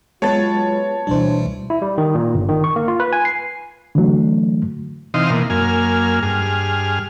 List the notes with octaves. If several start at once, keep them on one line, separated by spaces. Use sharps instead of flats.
F#3 G#3 B3 F4 B4 C#5 A5 A6
D2 B2 E3 G3 D4 C5
E4
G3
D#3
A#2
G1
D#3
C#6
A#3
F4
B4
G#5
C7
D3 E3 F#3 A3
C3 E3 D#4 D#5 F5 C6
B2 E3 A#3
F#2 A#3 G#5 F6
G2 G#4 F6